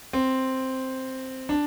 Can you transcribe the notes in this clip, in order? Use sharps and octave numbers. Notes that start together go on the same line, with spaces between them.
C4
D4